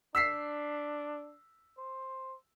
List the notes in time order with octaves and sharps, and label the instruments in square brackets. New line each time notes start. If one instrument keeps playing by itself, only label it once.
[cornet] D4 [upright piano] E6 B6 C7
[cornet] C5